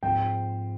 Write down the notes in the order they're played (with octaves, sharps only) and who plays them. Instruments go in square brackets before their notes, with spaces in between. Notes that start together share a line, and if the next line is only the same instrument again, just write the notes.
[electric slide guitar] G#2 F3 G#3 C4 [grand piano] G5